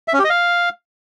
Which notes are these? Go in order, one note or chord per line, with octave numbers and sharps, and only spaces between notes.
E5
C#4
G4
D#5
F5